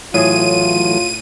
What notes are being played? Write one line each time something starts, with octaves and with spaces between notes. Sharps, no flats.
A2 E3 F#3 A3 F4 G#4 C#5 D#7